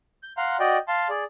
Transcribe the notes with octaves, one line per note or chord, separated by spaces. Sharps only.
G6
F5 F#5 A#5 C6
F#4 D5 D#5 G5
F5 A5 C6
G#4 D5